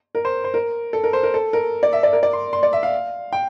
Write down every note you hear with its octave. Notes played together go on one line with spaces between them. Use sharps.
A#4
C5
C5
A#4
A4
A#4
C5
A#4
A4
A#4
D5
E5
D5
A#4
D5
C6
C6
D5
E5
F5
G5